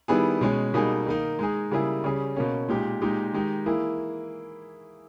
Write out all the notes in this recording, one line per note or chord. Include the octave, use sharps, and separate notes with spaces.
D#3 G3 B3 E4 G#4
B2 G#3 C#4 G#4
B2 G3 A#3 D#4 G#4
D#3 A#3 D#4
G#3 D#4 G#4
C#3 G3 A#3 E4 G#4
C#3 G3 C#4 G#4
B2 A#3 C#4
A#2 G#3 D#4 G4
A#2 G#3 D#4 G4
D#3 G#3 D#4 G4
E3 A#3 E4 G#4